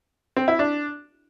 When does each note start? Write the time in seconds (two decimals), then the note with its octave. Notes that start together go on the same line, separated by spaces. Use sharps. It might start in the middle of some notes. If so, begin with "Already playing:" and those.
0.36 C4
0.48 E4
0.59 D4